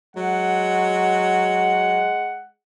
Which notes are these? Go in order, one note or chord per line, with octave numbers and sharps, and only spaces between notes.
F#3 G#3 F#5